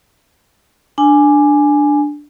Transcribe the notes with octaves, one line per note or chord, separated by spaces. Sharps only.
D4 G#5